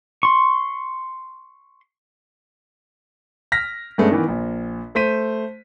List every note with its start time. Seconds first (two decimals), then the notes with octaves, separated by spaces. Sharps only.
0.23 C6 C#6
3.52 F6 A#6 B6
3.98 G2 G#3 A3 B3 C#4
4.11 D#3 E3 B3
4.28 A#1
4.95 A3 C5 B6 D#7